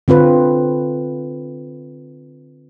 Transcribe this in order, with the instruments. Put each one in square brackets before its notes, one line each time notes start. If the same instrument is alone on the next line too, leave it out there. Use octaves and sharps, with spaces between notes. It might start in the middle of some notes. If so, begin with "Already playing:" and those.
[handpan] D3 C4 F4 B4